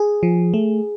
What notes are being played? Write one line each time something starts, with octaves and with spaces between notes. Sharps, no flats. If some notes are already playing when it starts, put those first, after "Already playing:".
Already playing: G#4
F3
A3